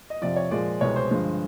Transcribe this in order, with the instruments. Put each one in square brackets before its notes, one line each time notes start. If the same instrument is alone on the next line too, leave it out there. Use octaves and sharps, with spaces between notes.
[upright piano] D#5
F2 C3 F3 D5
C#5
A#2 F3 G#3 D5
C2 B2 G#3 C#5
C5
G2 D3 F3 G#3